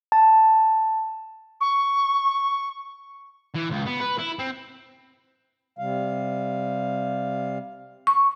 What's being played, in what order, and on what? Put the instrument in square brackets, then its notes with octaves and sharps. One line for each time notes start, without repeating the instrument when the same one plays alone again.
[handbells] A5
[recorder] C#6
[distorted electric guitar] E3
C#2
B3
B4
E4
C4
[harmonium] C3 G3 F5
[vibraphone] C#6